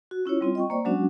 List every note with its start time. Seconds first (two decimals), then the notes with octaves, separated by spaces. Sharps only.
0.11 F#4
0.26 C#4 E4 F4 C#5
0.41 G3 C4 F4
0.55 D#5 G5 C#6
0.70 A#3 C5 D5
0.85 F#3 G#3 C#4 D4 F#4